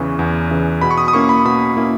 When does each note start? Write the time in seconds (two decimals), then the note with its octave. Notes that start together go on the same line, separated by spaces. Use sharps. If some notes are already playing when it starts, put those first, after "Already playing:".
Already playing: E2 C#3 E3 C#6
0.19 E2
0.51 C#3 E3
0.81 B2 B5
0.91 C#6
0.98 D#6
1.08 D#6
1.13 A#3 C#4 E4 C#6
1.29 B5
1.45 B2 B5
1.77 A#3 C#4 E4